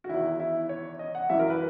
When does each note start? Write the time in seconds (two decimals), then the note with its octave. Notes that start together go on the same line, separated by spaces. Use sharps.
0.04 F#4
0.09 E2 D#3 E4
0.40 E4
0.69 C#5
0.99 D#5
1.15 F#5
1.30 F#2 E3 E5
1.39 A#4
1.50 B4